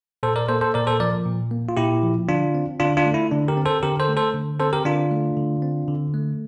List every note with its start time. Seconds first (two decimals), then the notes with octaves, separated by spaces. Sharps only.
0.23 A#2 A4 C5
0.36 A#4 D5
0.49 A#3 A4 C5
0.61 A4 C5
0.74 A#2 A#4 D5
0.87 A4 C5
1.00 F3 A#4 D5
1.26 A#2
1.51 A#3
1.69 F4
1.77 A#2 E4 G4
2.03 F3
2.29 D3 D4 F4
2.54 C4
2.80 D3 D4 F4
2.97 D4 F4
3.06 A3
3.14 E4
3.31 D3 D4
3.48 G4 A#4
3.57 C4
3.66 A4 C5
3.83 D3 G4 A#4
4.00 A4 C5
4.09 A3
4.17 A4 C5
4.34 D3
4.60 C4 A4 C5
4.73 G4 A#4
4.85 D3 D4 F4
5.11 A3
5.37 D3
5.62 C4
5.88 D3
6.14 A3